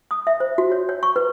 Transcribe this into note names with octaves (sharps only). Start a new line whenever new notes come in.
D#6
E5
C5
F#4
C#5
C#5
C#6
B4